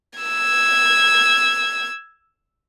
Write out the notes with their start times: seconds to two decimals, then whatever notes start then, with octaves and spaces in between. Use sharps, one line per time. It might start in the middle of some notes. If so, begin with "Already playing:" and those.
0.19 E6 G#6